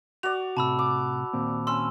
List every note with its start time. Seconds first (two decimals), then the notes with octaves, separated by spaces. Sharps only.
0.23 F#4 D5 F7
0.57 A2 C3 A5 B5 E6
0.79 D6
1.33 D#2 A#2 C4
1.67 C#4 C6 E6